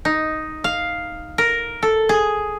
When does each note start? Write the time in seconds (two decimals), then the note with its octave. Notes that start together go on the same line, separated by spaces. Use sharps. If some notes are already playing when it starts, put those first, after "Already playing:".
0.05 D#4
0.64 F5
1.38 A#4
1.83 A4
2.09 G#4